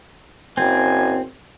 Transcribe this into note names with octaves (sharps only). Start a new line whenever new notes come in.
F#1 C4 G#5